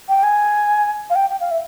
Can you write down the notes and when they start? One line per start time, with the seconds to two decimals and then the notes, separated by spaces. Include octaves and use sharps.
0.09 G5
0.23 G#5
1.10 F5
1.15 G5
1.30 G5
1.40 F5
1.51 E5